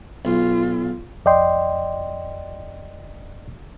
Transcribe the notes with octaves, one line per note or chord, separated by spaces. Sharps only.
B1 F4
F2 D5 D#5 G5 C6